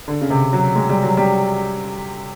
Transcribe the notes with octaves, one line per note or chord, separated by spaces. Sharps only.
D3
C#3
C3
F#3
G#3
G3
F#3
G3